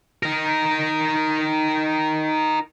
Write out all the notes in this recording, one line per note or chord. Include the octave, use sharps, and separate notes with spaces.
D#4 A#4